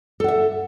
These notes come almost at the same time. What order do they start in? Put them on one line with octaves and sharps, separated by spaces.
A4 F#5 E5